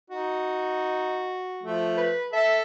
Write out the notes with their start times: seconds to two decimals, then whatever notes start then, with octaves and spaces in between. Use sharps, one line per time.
0.10 D#4 F#4
1.63 F3 A3
1.97 B4
2.33 A4 E5 A5